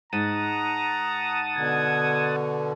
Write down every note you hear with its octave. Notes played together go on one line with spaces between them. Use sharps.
G#2 F#5 A5 A#5 D#6
B2 D3 G#6